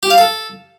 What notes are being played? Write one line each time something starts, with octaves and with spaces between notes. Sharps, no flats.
G4
F5
A4